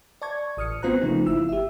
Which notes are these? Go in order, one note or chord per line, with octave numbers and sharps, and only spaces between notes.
D5 A5 C#6 G#6
A1 D#6 F6 C#7
B3 C4 F4 C5 A#5 F#6
C#3 F3 A3 A#3 D#4 F4
G1 E4 E6
G4 E5